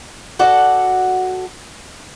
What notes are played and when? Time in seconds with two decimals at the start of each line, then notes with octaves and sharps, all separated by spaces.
0.39 F#4 A4 D5 F#5